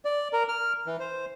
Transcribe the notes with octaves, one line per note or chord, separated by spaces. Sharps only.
D5
A#4
F6
E3
C5